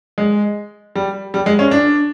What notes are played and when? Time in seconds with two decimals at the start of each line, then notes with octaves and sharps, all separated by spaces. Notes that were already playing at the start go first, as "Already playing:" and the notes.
0.18 G#3
0.96 G3
1.34 G3
1.46 G#3
1.59 C#4
1.71 D4